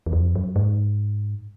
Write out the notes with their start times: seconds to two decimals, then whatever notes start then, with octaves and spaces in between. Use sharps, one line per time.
0.06 E2
0.13 F2
0.35 F#2
0.56 G#2